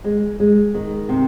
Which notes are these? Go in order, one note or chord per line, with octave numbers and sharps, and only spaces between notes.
G#3
G#3
D#3
C3